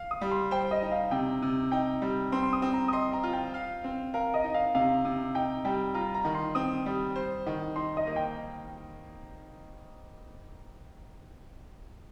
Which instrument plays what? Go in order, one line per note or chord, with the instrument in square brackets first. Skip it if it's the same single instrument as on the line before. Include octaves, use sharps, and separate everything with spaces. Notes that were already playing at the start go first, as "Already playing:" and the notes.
Already playing: [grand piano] F5
[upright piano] D#6
[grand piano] G3
[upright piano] C6
[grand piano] C5 [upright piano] G5
[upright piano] D#5
[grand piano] D#4
[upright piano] F5
[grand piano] C3 [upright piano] G5
[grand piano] C3
[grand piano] D#4 [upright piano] G5
[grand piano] G3
[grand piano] C4 [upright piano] C6
[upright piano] C6
D#6
[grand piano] C4
[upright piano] A#5
D#6
[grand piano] D#5 [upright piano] C6
[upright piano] A#5
[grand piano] F4
[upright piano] G5
[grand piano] F5
C4
[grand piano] A#4 [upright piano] F5
[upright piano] D#5
[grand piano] D#4
[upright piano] F5
[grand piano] C3 [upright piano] F5
[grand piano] C3
[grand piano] D#4 [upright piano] G5
[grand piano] G3 [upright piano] G5
[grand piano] F4 [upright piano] A#5
[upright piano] A#5
[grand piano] D#3
[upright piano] C6
[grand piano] C4 [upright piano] D#6
[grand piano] G3
C5
D#3
[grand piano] D#4 [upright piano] C6
[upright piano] D#5
[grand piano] A#3
[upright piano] G5